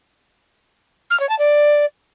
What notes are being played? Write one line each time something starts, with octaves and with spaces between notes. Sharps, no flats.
F6
C#5
A5
D5